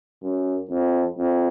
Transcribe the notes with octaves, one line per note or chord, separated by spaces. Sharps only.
F#2
F2
F2